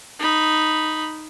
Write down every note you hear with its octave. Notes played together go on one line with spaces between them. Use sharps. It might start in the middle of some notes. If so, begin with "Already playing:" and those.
D#4 B5